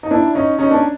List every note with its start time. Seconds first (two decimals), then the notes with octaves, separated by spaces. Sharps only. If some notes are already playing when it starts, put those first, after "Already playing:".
0.03 D#4
0.11 D4 E4
0.35 C#4 D#4
0.59 C#4 D#4
0.71 D4